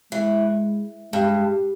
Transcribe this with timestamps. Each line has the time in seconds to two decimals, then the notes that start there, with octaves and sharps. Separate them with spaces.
0.12 E3 G#3
1.13 G2 G#3